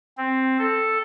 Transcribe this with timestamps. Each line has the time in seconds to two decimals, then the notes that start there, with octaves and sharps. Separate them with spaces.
0.18 C4
0.59 A4